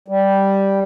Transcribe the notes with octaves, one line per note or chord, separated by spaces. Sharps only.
G3